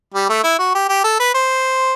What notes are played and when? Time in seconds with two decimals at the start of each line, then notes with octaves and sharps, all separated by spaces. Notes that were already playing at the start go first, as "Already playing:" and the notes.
0.14 G3
0.29 A3
0.44 E4
0.59 F#4
0.75 G4
0.89 G4
1.04 A4
1.20 B4
1.34 C5